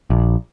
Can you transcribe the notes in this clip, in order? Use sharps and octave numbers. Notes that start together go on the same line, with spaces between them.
A#1